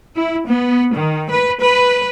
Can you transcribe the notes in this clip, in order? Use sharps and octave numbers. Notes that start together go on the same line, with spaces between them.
E4
B3
D#3
B4
B4